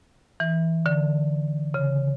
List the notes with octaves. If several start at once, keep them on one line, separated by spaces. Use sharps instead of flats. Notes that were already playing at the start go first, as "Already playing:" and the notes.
E3
D3
C#3